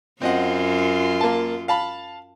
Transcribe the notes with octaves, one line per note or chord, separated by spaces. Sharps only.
F#2 F#3 C4 F4 D#5 F#5
A#3 A5
F5 A5 B5